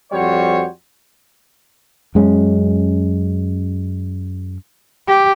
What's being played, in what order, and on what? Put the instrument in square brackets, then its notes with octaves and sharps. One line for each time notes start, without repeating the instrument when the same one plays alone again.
[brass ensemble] F2 G3 F#4 C5 C#5
[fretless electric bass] F#2 G#3 C#4
[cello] G4